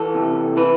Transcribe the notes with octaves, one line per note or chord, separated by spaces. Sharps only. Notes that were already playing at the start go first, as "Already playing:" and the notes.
Already playing: E3 A4
C3
E3 B4